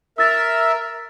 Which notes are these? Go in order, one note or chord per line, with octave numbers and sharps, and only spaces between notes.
A#4 E5 E6 A6